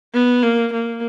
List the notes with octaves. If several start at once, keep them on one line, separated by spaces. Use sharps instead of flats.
B3
A#3
A#3